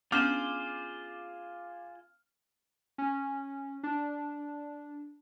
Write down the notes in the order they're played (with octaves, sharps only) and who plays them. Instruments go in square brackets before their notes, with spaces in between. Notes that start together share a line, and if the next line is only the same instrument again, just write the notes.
[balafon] B3 C#4 D4 [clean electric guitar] F4 G#4 C5 [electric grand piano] D6 F6
[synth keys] C#4
D4